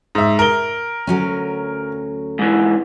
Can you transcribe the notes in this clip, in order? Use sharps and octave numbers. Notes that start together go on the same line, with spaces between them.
G#2 E5
A#4 G7
D2 F#3 C#4
G#2 E3